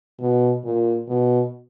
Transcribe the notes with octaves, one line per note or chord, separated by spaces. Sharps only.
B2
A#2
B2